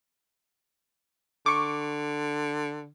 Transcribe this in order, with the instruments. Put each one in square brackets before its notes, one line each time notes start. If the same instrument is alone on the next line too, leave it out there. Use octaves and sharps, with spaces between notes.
[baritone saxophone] D3 [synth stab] C#6 D6